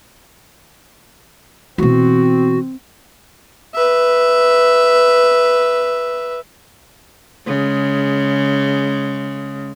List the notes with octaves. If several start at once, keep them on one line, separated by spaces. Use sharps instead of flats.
B2 E3 C4 F#4
B4 E5
C#3 G#3